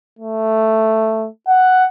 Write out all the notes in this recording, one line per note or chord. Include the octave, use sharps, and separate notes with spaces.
A3
F#5